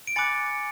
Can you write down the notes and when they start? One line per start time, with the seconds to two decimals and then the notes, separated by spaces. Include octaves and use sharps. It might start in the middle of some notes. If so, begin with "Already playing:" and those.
0.07 D7
0.16 G#5 B5 D6 F#6 A6 C#7